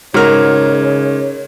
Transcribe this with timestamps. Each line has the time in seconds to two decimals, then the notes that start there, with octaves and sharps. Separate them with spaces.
0.14 G#2 C#3 F#4 A#4 C#5 F6